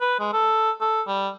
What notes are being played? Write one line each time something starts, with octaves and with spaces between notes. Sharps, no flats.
B4
G#3
A4
A4
G3